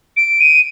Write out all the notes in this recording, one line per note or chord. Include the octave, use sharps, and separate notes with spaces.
D7
D#7